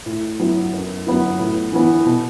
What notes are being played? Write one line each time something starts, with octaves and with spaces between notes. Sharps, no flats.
A2
F#3 B3 E4
F#2
F#3 B3 E4
A2
E3 B3
B2